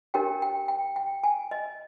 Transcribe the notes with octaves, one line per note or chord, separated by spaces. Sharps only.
D4 G4 A#4 C#5 G5
G5
G5
G5
G#5
D#5